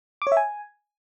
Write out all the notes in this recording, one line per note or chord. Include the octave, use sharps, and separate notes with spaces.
D6
C#5
E5
G#5